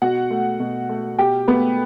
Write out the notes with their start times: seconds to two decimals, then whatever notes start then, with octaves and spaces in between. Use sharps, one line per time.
0.02 B2 F#4 F#5
0.31 A3
0.60 B2
0.89 A3
1.18 B2 G4 G5
1.48 A3 B3 B4